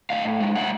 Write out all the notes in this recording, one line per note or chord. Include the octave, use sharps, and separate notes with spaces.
A2 D#5 F5
G#3
E5 F#5